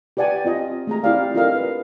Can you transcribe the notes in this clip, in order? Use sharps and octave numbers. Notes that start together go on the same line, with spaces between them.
G4 B4 D5 F#5 G#5 A5
C4 F4 D#5
A3 G#4 A#5
C4 E4 G4 D5 F5 G5
D4 F4 A4 A#4 D#5 F5
B4